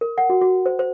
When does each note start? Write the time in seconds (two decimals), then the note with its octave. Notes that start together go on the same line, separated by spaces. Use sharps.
0.01 A#4
0.18 F#5
0.30 F#4
0.41 F#4
0.66 C5
0.79 C5